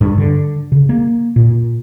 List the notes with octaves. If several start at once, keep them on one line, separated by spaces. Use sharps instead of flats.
G2
D3
C#3
A#3
A#2